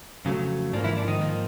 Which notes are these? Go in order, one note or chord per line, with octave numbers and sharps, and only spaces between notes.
F2 C#3 F#3 A3
G#2 F3 A#3 D4
E3 E4
D4
D#3 D#4
G#2 F3 A#3